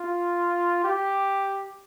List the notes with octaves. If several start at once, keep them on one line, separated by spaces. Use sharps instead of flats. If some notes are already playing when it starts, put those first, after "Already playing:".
Already playing: F4
G4